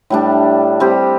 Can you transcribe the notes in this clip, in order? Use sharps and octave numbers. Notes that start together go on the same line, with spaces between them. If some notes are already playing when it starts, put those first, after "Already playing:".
A2 G3 D4
G3 C4 G4